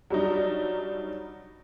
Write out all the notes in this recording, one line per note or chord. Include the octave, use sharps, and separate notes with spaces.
F#3 G3 D4 D#4